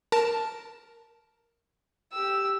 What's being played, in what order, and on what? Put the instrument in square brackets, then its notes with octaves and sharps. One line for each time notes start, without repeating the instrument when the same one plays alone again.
[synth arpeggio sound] A#4 A5
[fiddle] G4 E6